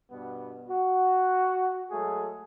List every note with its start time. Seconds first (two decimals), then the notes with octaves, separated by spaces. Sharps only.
0.11 G2 B2 B3
0.68 F#4
1.91 F#3 G#3 A3 G#4